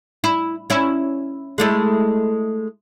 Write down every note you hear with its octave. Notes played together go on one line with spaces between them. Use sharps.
E4
C#4 E4
G#3 A3 E4